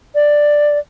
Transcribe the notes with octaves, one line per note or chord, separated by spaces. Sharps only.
D5